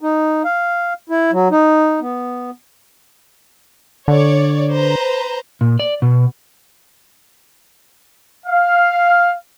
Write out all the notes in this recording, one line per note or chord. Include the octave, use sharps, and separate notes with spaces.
D#4
F5
E4
F#3
D#4
B3
D3 C#5 D5
B4 C5 A#5
A#2
D5
B2
F5